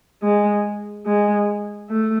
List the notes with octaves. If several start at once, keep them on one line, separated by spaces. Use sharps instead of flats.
G#3
G#3
A3